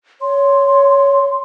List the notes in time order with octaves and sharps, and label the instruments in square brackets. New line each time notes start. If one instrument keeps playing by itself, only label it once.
[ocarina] C#5 [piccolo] C6